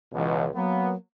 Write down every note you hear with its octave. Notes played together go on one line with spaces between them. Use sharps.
C#2 B2 E3
F#3 A#3 B3